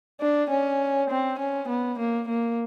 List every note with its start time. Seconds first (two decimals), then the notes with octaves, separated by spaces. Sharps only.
0.21 D4
0.50 C#4
1.10 C4
1.39 C#4
1.69 B3
1.99 A#3
2.29 A#3